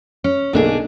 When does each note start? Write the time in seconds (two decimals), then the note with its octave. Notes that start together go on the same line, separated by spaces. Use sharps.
0.24 C#4
0.53 B1 D3 A#3 D4 G#4